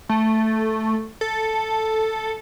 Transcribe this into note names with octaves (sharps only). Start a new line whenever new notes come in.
A3
A4